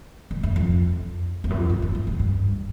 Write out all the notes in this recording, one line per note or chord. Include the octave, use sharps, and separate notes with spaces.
G2
F#2
F2
E2
F#2
F2
F#2
F2
F#2
F#2
G2